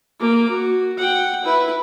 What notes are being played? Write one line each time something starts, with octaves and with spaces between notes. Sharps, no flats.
A#3 D6
F#4
F#5 G5
E4 B4